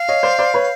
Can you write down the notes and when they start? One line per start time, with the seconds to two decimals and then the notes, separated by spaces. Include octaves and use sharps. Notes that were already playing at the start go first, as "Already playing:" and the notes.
Already playing: F5
0.09 C#5 D#5
0.23 C5 D5
0.39 C5 D5
0.54 B4 C#5